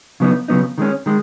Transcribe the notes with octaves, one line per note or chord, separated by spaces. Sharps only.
C#3 F#3 B3 D#4
C#3 F#3 B3 D#4
D#3 G#3 C#4
D#3 G#3